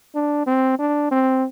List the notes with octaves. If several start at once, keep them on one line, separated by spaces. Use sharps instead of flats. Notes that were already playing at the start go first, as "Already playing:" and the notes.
D4
C4
D4
C4